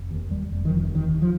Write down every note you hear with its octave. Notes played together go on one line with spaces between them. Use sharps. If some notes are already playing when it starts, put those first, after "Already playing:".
Already playing: F1
D#2
D#2 G3
F1
D#3
F1 F3
D#2
D#3
D#2
F3